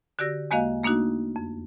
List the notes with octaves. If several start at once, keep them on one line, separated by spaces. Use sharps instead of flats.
D3 F#4 G4 D5 E6 A#6
E2 G#3 A#3 F#4 D#5 F5
A3 A#3 D4 D#4 F#4
F2